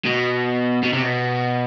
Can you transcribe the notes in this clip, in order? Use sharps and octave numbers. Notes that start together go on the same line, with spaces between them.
B2
B2
C3
B2